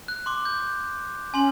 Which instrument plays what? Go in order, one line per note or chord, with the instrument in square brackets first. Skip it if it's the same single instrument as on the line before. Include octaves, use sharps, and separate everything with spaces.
[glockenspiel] F#6
C6 D6
G6
[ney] C#4 [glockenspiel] G#5 C6 F#7